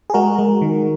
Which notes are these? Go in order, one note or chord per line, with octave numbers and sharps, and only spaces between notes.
G#4
G#3 F#4 A#4
G#3
D#3